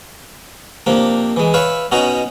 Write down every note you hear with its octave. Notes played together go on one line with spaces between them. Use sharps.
C3 F3 A#3 D4
E3 G#3
B4 C#5 E5 F5 B5 C#6
B2 C#4 D#4 F#4 A#5